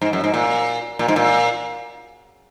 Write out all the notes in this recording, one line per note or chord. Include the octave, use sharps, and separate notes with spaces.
G#2
F#2
G#2
A#2
A#2
G#2
A#2